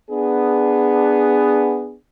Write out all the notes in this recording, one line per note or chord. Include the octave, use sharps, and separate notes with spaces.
B3 D4 G#4